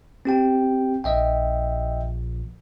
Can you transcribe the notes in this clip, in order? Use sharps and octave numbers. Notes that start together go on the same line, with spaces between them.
C4 G4 G5
A#1 D#5 E5 G5